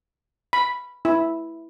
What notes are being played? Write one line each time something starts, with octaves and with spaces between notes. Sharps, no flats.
B5
E4